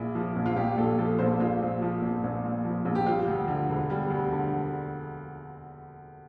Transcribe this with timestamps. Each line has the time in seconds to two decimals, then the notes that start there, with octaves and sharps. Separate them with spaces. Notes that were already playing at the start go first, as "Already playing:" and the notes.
Already playing: A#1 A#2 E4
0.15 F3
0.36 A#1
0.46 F4
0.56 A#1 G4
0.78 A#2 A4
0.98 F3 A4
1.19 A#1 C5
1.40 A#1 F4
1.61 A#2
1.82 F3
2.02 A#1
2.24 A#1
2.44 A#2
2.65 F3
2.85 A#1
2.95 G4
3.06 G3 F4
3.27 D2
3.48 D3
3.69 E1
3.90 G3
4.10 D2
4.32 D3